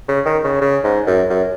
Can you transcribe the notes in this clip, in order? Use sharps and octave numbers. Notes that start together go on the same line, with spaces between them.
C#3
D#3
C#3
C#3
G#2
F#2
F#2